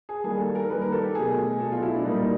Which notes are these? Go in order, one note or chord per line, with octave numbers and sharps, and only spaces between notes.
G#4
D#3 G3 A#3 G#4
A4
A#4
D#3 G3 A#3 B4
A#4
A4
G4
B2 F#3 A3 G#4
B2 F#3 A3 A4
F4
E4
D4
A#2 G3 A#3 D#4